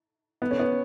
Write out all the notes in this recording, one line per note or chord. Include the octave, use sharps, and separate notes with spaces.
B3
C#4
B3